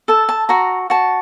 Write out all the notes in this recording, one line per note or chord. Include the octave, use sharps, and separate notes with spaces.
A4 A5
A5
F#4 A#5
F#4 A5